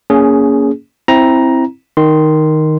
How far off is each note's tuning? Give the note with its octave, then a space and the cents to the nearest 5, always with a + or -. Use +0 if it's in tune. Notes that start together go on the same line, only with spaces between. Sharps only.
A#3 +0 C#4 +20 G#4 +0
C4 +10 E4 +0 A#5 +10
D#3 +0 C6 -5